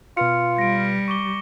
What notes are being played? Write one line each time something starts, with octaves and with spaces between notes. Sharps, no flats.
B2 F4 B4 F6 C#7
G3 A#6 D7
C#6 D6 G7